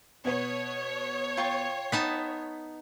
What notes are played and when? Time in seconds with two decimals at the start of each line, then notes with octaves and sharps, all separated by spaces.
0.25 B2 B3 C#5
1.37 F4 G5 C#6
1.92 B3 D#4 A5 B6